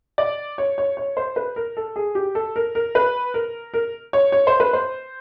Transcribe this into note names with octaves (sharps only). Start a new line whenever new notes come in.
D5
C#5
C#5
C#5
C5
B4
A#4
A4
G#4
G4
A4
A#4
A#4
B4
A#4
A#4
C#5
C#5
C5
B4
C5